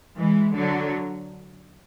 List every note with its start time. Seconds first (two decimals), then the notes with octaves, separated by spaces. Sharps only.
0.17 E3 G#3
0.55 D3 F#3